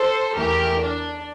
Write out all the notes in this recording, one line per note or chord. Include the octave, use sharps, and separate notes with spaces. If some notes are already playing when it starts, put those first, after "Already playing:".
Already playing: A4 C5
E2 E3 A3 G4 A#4
D4